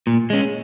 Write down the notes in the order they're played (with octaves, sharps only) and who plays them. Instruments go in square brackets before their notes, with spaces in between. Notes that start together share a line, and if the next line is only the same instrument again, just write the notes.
[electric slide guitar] A#2
G#3 C#4